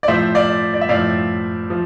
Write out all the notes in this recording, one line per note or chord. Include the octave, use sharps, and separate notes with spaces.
D5
A2 F3 C5 E5
D5 F5
D5
E5
A2 F3 D5 F5
F3